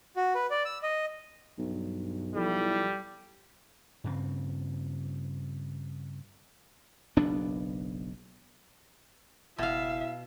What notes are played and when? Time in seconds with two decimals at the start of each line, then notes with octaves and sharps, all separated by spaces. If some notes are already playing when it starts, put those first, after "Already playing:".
0.16 F#4
0.35 B4
0.51 D5
0.65 E6
0.83 D#5
1.59 B1 G2
2.34 F3 G3 E4 A4
4.04 G2 C#3 C4
7.17 F#1 B1 B3 D4
9.58 F#1 B2 E4 E5 F5